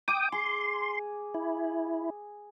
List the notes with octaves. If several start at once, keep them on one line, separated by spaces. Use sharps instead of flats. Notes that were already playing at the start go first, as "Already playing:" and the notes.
G5 D6 D#6
G#4 C6
E4